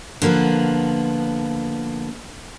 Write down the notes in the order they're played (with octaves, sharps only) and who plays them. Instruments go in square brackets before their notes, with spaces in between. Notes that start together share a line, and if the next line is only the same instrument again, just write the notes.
[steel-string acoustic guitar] D3 F3 A#3 B3 B4